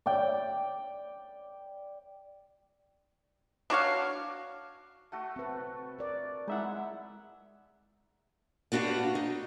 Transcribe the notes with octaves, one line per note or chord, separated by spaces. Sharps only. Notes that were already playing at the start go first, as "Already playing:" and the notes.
D5 G5
D4 F#4 C#5 F5
A3 F#4 A4
C4 B4
A#4 D5
G#3 D#4 E4 E5 F#5
B3 D4 F#4 G4 F5
D#4